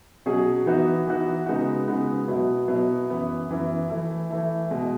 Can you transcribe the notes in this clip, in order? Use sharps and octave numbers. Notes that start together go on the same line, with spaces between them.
B2 F#3 C#4 G#4
E3 B3 D#4 F#4
E3 B3 D#4 F#4
C#3 G#3 B3 D#4 F#4
C#3 G#3 B3 D#4 F#4
B2 F#3 B3 E4
B2 F#3 B3 E4
F#2 E3 B3 E4
F#2 E3 B3 E4
E3 A3 E4
E3 A3 E4
B2 G#3